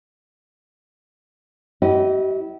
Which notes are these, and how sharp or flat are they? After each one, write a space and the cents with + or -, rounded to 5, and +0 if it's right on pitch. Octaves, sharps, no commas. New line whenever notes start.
E4 -25 G4 -45 D#5 +0